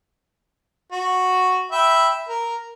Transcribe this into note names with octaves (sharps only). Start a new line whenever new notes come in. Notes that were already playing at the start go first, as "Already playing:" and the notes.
F#4
E5 G5 B5
A#4